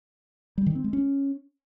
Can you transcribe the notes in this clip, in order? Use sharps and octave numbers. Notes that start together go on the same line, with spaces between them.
G3
D#3
C4
G#3
C#4